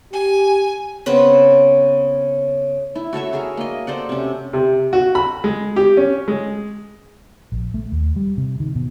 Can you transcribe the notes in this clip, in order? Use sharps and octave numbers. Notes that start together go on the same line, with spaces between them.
G4 G#5
C#3 B3 C4 B4
E4
F#4 A4 C#5 E5
F#4 G#4 A#4 E5
A#3 D#5
A4 C5 D5 F#5
C3 C#4
C3
F#4
B5
G#3
G4
C#4
G#3
A#1
A3
D#2
G3
C3
D#3
B2